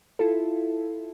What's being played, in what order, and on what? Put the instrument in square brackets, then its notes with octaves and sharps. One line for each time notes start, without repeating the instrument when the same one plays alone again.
[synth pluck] E4 F4 A4